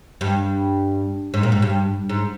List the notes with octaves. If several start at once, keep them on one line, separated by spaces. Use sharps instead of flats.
G2
G#2
A#2
G#2
G2
G#2